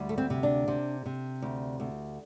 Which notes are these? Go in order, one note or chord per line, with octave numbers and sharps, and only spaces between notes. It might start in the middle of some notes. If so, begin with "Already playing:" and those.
Already playing: D2 G3
A3
C4
C3
D4
C3
C3
D2
D2